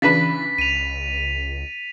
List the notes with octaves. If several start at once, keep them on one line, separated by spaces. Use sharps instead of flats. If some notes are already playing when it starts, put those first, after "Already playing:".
C#3 E3 D4 B4 A6 B6
C#2 D#7 F7